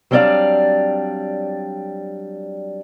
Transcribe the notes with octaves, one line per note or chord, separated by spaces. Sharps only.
F#3 G3 C4 D4 D5 F5